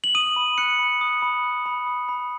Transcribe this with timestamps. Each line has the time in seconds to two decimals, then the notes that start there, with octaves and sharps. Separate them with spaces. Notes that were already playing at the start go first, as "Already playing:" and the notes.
0.04 F#7
0.15 D#6 D#7
0.36 B5
0.58 F#6 C#7
0.79 B5
1.01 D#6
1.22 B5
1.43 F#6
1.66 B5
1.87 D#6
2.09 B5